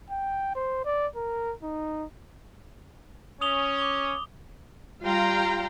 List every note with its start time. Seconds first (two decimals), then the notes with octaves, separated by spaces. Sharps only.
0.10 G5
0.55 C5
0.85 D5
1.16 A#4
1.63 D#4
3.41 C#4 D#6 F7 G7
3.78 D6 G7
5.02 G3 F4 F5 G5 A#5 C6